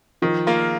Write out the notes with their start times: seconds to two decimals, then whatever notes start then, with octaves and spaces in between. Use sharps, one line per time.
0.22 D#3 F3
0.47 A#3 F4